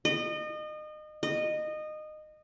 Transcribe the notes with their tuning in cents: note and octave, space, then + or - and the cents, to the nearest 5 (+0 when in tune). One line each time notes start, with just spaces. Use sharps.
D#5 -30
D#5 -20